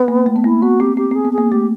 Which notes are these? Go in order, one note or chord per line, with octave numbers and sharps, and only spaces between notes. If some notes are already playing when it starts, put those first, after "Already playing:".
Already playing: B3
A#3
A3
B3
A#3 E4
B3 F#4
C4 G4
C4 G4
C4 G#4
B3
A#3 G#4
A3 G4